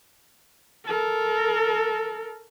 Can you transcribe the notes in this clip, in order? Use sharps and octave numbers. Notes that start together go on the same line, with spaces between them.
A4 A#4